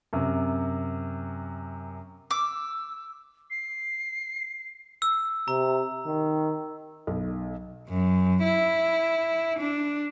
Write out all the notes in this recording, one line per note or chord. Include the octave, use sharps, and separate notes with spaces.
F#2 C3
D6 E6
C7
E6
C3 A#5
D#3
B1
F#2
E4
D4